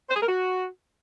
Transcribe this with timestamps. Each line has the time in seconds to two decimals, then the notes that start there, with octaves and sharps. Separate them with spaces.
0.10 C5
0.16 G#4
0.22 A#4
0.28 F#4